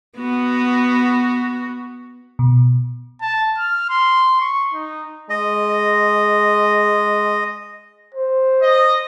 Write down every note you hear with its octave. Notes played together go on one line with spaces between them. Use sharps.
B3 F#4
B2
A5
F6
C6
C#6
D#4
G#3 D#5
C5
D#5